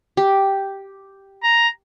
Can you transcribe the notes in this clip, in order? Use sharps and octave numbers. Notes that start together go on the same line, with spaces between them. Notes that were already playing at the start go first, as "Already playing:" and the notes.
G4
A#5